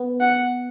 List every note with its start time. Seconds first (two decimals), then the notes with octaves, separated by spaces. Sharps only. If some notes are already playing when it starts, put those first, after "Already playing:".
Already playing: B3
0.20 F#5